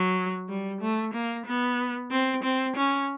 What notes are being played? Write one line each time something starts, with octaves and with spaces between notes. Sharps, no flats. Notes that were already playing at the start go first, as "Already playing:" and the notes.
Already playing: F#3
G3
A3
A#3
B3
C4
C4
C#4